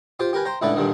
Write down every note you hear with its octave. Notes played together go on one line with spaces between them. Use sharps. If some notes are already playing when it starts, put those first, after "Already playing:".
F4 G4 C5
G4 A#4 B4 G#5
C5 G5 A#5
C#2 A2 D3 E4 B4 D5
G2 A#2 D3 D#3